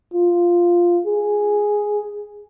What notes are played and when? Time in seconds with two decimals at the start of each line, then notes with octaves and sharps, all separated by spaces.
0.14 F4
1.06 G#4